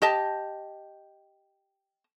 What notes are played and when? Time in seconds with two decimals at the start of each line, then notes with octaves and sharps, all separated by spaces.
0.02 G4 D#5 A5